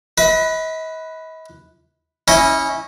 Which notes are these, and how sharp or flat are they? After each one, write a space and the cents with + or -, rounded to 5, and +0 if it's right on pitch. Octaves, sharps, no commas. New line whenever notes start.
B4 +0 D#5 +40
C#4 -5 E4 -25 D#5 +0